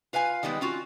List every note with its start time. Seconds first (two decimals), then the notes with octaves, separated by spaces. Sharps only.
0.13 F4 B4 F5 G#5
0.43 D#3 G3 G#3 B3
0.61 C#4 F4 F#4